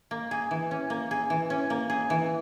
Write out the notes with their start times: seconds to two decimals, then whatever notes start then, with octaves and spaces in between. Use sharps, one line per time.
0.11 A#3
0.31 G#4
0.51 E3
0.71 C#4
0.90 A#3
1.11 G#4
1.30 E3
1.50 C#4
1.70 A#3
1.90 G#4
2.10 E3